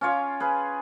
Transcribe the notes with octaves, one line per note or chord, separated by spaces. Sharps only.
C#4 F4 C#5 D6
G#4 B4